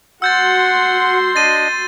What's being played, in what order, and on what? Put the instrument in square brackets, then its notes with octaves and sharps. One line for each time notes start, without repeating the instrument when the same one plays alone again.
[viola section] F#4 C6 [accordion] F#5 [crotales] E6 G6 A6
[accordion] D4 D#5 [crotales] A6 D#7